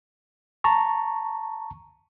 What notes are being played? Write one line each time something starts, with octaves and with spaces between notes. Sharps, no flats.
A5 A#5 C#6